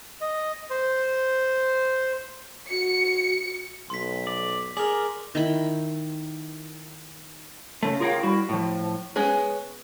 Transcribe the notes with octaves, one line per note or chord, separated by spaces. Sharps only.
D#5
C5
F#4 C#7
B1 C6 B6
D5
G#4 A#4 D5
D#3 E4 B5
C#3 A3
F4 G#4 A#4 C#5 F5 G5
G3 E4 F#4
A2 F3
G#3 B3 C#4 G#4